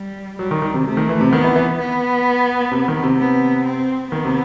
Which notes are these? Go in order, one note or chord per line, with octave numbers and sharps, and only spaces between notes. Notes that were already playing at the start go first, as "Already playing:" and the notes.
Already playing: G3
F#3 G3
D#3
D#3
C3
C3 A3
D#3
E3
C3
D#3 B3
E3
E3
B3
C3
D#3
C3
B3
C4
D#3 B3
C3